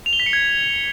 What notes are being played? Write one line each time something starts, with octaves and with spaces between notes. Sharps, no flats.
F7
G7
B6
C#7
G#6